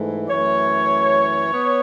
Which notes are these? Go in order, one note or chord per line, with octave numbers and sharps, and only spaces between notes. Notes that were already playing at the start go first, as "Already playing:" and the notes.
Already playing: G#2 E3 A3
F#2 E3 A3 C#5
B3